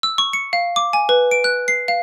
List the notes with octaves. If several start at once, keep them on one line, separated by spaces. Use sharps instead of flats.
E6
C#6
C#7
F5
D6
G#5
B4
D7
F#6
C7
F5